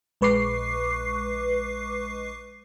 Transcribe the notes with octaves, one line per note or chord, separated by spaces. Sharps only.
A#1 G#3 B4 C#6 D6 C7